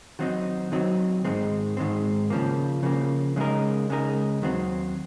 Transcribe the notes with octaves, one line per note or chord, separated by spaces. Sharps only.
D#3 F#3 C4 D#4
D#3 F#3 C4 D#4
G#2 D#3 G#3 C4
G#2 D#3 G#3 C4
C#3 F3 A#3
C#3 F3 A#3
C#3 G#3 D#4 A#4
C#3 G#3 D#4 A#4
D#2 D#3 F#3 C4